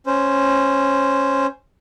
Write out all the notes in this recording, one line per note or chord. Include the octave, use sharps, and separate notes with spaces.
C#4 C5